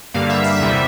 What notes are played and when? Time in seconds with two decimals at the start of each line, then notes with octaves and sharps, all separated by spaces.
0.14 G2 D3 G3 A#3 F5
0.30 E5
0.44 E5
0.60 E2 C3 G3